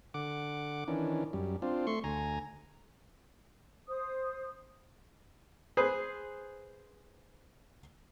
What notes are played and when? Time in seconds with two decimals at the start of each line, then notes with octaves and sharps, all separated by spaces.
0.14 D3 F#5 D6
0.88 D#3 E3 C#4 D4
1.33 F#2 G3
1.62 C4 D4 F4
1.87 A3 C6 C#6
2.04 D2 G#5 A#5
3.88 C5 D#6
5.77 G#4 B4 C5